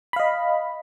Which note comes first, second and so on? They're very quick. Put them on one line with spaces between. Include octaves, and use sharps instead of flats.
B5 F5 D#5